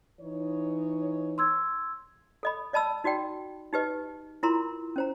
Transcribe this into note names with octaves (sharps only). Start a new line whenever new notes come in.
E3 D#4 C#5
C6 E6 G#6
A4 D#5 B5
D5 D#5 A5 B5 E6
D#4 F#4 D5 G5
D#4 G4 B4 D#5
E4 F4 A#4 A#5 C6
C#4 C5 A#5